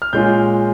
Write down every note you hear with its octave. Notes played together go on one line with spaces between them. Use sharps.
F6
A#2 G#3 C#4 F4 G6